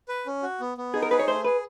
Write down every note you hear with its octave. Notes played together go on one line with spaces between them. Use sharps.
B4
C#4
F#4
B3
B3
D#4 G#4
A#4
G#4 B4
C#5
A3 C5
G#4 B4